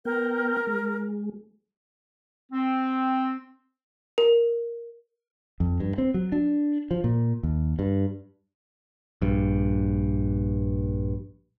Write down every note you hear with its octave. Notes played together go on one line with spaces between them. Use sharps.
B3 A#4 G5
G#3
C4
A#4
F2
G2
C4
F#3
D4
F3
A#2
D#2
G2
A#1 G2